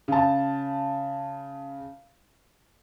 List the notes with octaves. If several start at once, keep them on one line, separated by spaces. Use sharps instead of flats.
C#3 A5